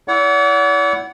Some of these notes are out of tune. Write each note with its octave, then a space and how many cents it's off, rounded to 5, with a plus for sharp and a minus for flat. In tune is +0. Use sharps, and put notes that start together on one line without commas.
E4 +0 D5 -45 F#5 +0